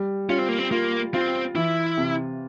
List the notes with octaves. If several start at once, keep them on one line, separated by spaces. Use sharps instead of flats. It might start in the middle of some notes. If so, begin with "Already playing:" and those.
Already playing: G3
C#4 F4
C4
A#3
C4
A#3 F4
C4 F4
E3 E4
C3